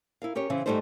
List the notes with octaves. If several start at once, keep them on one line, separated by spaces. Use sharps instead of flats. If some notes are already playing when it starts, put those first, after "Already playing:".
E4 A#4 F5
C#4 G4 A#4 C#5
C#3 E3 C4 C#4
G#2 B2 G3 A3 D#4 C5